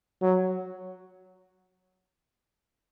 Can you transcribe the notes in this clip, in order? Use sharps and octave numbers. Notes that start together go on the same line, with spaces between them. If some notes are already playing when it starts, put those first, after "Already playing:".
F#3